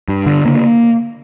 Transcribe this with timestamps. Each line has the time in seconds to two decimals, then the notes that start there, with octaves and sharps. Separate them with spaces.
0.08 G2
0.26 D3
0.45 C#3 A#3